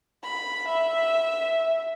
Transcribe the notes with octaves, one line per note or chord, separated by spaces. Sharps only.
B5
E5